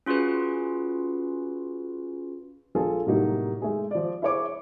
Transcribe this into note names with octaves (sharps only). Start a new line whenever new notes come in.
C#4 F4 F#4 G#4 B4
A#1 F4 G#4 A4
A2 C3 F#3 G3 A#3 D#4
G#3 A3 G#4
F3 D5
E4 G#4 C5 C#5 C#6 D6